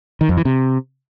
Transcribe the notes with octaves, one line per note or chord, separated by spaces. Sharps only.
D#3
F2
E3
C3